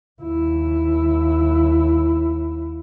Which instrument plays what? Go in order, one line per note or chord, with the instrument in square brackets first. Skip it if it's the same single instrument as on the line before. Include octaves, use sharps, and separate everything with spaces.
[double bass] D#2 E4